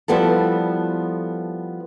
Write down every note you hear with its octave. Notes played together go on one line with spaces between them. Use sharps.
F3 G3 B3 E4 A4